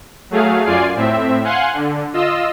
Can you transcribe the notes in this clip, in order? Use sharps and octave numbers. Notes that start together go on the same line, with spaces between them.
F#3 A3 G#4 F5
F#2 F4 D5 G#5 C7
A2 C4 E5
F5 F#5 G#5 C6 F#6
D3
F4 D#5 E6